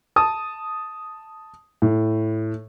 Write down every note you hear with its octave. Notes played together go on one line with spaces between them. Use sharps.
A5 D#6
A2